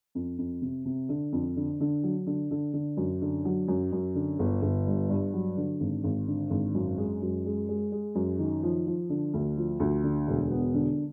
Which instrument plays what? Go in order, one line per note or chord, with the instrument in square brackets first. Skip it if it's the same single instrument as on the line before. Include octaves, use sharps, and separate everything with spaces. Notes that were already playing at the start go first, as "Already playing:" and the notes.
[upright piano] F2
F2
C3
C3
D3
F2
D3
D3
F#3
D3
D3
D3
F#2
D3
F#3
F#2
F#2
D3
G1
G1
G2
G2
F#3
D3
G#1
G#1
D3
G#1
F#2
G#3
F#2
G#3
G#3
G#3
F#2
D#3
F3
F3
D3
D2
F3
D2
D3
E1
B3
D3